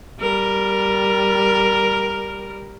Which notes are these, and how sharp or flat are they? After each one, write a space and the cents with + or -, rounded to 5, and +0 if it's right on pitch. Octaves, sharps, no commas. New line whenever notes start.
G3 +0 A#4 +0